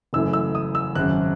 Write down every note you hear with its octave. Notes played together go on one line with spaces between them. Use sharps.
F#1 F#2 E3 A3 E6
E6
D#6
E6
G#1 F#2 C#3 F#6